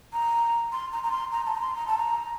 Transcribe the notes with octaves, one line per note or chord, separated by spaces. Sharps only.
A#5
C6
A#5
A#5
C6
A#5
A5
A#5
C6
A#5
A5
A#5